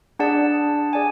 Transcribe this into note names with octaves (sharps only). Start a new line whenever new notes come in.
D4 G#4 D5 F#5 A5
G#4 D5 G#5